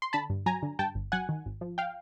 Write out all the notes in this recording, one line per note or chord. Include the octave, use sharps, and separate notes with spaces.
C6
D3 A5 B5
G2
F#3 G#5 A#5
D3
G2 G5 A5
G1
F#3 F#5 G#5
D#3
G#1
F3
F5 G5